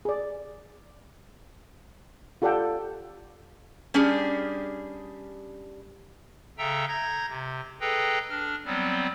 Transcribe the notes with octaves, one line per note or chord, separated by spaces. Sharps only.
G#4 D5
F4 G4 A4 D5 F#5 G5
G3 C#4 D4 G4 G#4
C#3 A4 E5 G5 A#5 E6
A#5 G6 G#6 A#6
C3
G#4 A4 B4 D#5 G5 A#5
D4 F6
F#3 G3 B3 C4